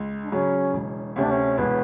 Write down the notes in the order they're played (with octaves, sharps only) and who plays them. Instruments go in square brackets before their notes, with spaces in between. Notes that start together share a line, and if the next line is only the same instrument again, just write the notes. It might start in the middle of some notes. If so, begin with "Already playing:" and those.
Already playing: [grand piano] C#2
[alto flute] D4
[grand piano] C#3 F#3 [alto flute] C#4
[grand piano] E1
[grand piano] D2 C3 [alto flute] C#4
[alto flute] D4
C#4
[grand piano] E1 [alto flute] B3